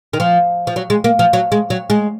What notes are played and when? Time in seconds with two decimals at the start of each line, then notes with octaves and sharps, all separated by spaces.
0.13 D#3
0.20 F3
0.67 F3
0.76 F#3
0.90 G#3
1.04 A#3
1.19 F3
1.33 F#3
1.52 G#3
1.70 F#3
1.90 G#3